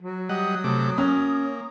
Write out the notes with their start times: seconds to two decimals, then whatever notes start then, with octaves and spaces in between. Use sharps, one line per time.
0.02 F#3
0.29 G3 D#5 F#5 D#6
0.64 C3 A3 D6
0.98 A#3 C#4